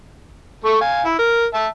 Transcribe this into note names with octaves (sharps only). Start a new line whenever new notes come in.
A3 A4 C#6
F5 G#5
E4
A#4
E5 A5